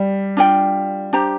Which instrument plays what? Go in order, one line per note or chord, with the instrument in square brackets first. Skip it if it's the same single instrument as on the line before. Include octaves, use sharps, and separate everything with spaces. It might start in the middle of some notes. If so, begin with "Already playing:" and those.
Already playing: [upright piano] G3 [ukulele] G4
[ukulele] D4 F4 D5 G5
D4 G4 C5 A#5